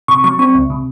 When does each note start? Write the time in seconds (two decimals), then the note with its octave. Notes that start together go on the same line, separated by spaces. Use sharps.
0.08 C3 C#6
0.24 F#3 C#6
0.39 C4 C#6
0.55 C#2
0.70 C3